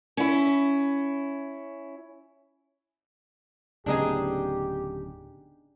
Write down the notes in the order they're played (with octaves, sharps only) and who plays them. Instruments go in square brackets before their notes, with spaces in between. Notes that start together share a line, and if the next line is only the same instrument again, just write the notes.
[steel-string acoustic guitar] C#4 E4
[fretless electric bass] D1 C#3 B3 [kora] D4 D#4 G#4 [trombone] G4